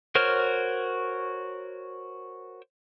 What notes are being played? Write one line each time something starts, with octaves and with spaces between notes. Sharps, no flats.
F#4 A#4 C5 C#5 F6